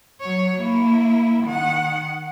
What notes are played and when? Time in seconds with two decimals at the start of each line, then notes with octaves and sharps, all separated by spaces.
0.20 F#3 C#5
0.57 A#3 E4
1.44 D#3 F#5